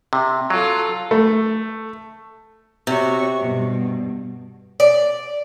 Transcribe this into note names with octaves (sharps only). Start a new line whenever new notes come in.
C3
F#3 F4 A4
A3
C3 F#4 C#5 C#6
G2 B2
D5